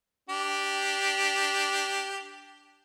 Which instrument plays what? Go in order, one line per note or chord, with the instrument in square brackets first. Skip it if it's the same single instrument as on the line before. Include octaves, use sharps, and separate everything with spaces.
[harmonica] D4 G4